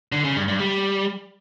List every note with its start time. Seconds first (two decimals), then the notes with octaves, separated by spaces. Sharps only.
0.12 D3
0.24 C#3
0.36 G2
0.48 G2
0.60 G3